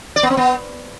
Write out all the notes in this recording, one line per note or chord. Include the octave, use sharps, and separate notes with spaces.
D5
B3
C4
B3